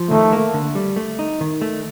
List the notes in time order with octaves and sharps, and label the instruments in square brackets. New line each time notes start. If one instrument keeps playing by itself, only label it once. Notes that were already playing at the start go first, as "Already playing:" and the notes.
Already playing: [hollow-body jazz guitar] F3
[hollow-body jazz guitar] D#3 [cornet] A3
[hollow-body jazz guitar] A#3
D3
G3
A3
D#4
D#3
A3